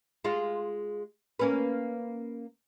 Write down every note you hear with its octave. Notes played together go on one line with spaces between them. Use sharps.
G#3 F4
A#3 C#4 B4